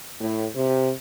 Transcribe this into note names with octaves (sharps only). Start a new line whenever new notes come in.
A2
C3